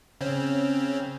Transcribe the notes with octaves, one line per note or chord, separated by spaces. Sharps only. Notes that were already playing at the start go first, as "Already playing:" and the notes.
C#3 C4 C#4